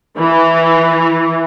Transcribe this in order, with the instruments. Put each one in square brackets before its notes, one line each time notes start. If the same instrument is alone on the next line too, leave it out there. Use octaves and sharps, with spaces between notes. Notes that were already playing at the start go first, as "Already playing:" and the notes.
[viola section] E3